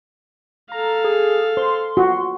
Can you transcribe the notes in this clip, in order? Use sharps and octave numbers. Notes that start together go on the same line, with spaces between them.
A4 F5 A#5
G#4
C5 C6
F4 F#4